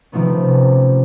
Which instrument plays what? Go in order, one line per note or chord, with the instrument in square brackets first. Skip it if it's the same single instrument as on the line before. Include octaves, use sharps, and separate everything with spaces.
[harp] C3 D#3 F3 A3 B3 C#4